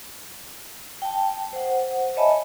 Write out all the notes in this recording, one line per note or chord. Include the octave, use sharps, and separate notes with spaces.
G5 A5
C5 F#5
C#5 D#5 E5 G#5 A5 B5